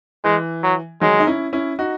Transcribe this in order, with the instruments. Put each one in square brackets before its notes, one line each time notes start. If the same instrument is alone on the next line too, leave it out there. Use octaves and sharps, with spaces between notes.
[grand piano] E3 [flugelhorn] G#3
[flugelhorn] F#3
[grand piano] D#3 F#3 [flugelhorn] G#3
[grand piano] D#4
C#4 E4
C#4 E4
D#4 F#4